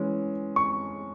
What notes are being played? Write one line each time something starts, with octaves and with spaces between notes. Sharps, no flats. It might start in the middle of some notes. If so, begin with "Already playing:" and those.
Already playing: E3 G#3 C#4
C#6